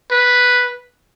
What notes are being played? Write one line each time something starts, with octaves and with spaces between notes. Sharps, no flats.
B4